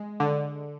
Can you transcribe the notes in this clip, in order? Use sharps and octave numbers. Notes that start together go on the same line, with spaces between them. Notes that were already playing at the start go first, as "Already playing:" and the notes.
Already playing: G#3
D3